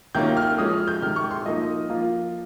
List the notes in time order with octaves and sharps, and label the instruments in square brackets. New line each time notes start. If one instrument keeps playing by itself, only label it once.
[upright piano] C3 D#3 A#3 C#4 F4 G6
F6
F3 G#3 C#4 D#6
F6
G6
C3 D#3 G#3 F6
C#6
C6
F3 A#3 D#4 D#5
F3 A#3 F4